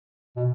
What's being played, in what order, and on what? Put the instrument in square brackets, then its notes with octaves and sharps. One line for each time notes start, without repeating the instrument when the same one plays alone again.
[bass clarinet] B2